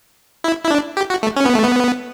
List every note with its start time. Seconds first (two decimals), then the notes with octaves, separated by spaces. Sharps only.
0.44 E4
0.64 E4
0.71 D4
0.97 G4
1.10 F#4
1.23 A3
1.36 C#4
1.46 B3
1.55 A3
1.64 B3